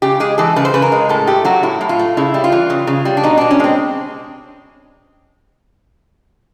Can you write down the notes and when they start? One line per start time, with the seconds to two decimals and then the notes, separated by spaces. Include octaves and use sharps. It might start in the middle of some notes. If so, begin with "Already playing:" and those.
0.02 C#3 G4
0.20 G#3 G#4
0.38 E3 A4
0.56 C#3 B4
0.65 C5
0.74 C#3 B4
0.82 A#4
0.92 G#3
1.09 A2 A4
1.27 A3 G4
1.45 F#3 F#4
1.63 A2 E4
1.81 A2
1.89 F4
1.99 A3
2.17 C#3 E4
2.34 G3
2.44 F4
2.52 E3
2.70 C#3
2.87 C#3
3.05 G3
3.17 D4
3.24 B2 D#4
3.37 B2 D4
3.51 C#4
3.60 G#3 C4